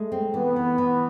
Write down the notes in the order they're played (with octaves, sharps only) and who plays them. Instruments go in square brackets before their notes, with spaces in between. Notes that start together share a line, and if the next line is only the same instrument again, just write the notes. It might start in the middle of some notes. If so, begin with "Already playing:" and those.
Already playing: [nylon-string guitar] G#3 [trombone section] A3
[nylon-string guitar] C4
[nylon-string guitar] E3 [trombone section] B3
[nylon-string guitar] E3
E3